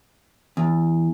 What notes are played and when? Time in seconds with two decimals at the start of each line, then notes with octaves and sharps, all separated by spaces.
0.57 E2